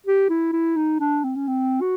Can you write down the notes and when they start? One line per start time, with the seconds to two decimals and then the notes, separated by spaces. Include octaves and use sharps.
0.07 G4
0.30 E4
0.53 E4
0.76 D#4
1.00 D4
1.24 C4
1.36 C#4
1.47 C4
1.81 F#4